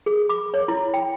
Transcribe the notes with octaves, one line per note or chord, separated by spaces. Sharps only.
G#4
D6
C#5
E4
G5